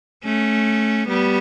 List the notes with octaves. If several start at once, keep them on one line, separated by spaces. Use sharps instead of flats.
A3 C#4
G3 B3